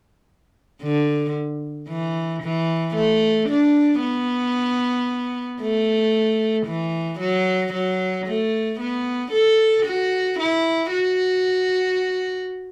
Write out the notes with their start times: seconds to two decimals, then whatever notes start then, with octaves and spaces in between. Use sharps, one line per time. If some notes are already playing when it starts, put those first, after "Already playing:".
0.83 D3
1.89 E3
2.43 E3
2.95 A3
3.49 D4
4.01 B3
5.61 A3
6.66 E3
7.20 F#3
7.73 F#3
8.27 A3
8.80 B3
9.32 A4
9.86 F#4
10.40 E4
10.91 F#4